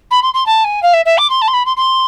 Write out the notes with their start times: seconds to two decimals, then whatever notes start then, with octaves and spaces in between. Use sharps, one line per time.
0.11 B5
0.22 C6
0.34 C6
0.46 A5
0.64 G#5
0.82 F5
0.93 E5
1.05 E5
1.18 D6
1.30 C6
1.41 A5
1.48 C6
1.53 B5
1.65 C6
1.77 C6